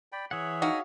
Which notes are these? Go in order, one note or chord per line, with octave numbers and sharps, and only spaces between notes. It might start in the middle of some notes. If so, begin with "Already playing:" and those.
D5 G5 B5
E3 G#4 C#5 E5 F#5
D#4 F#4 F5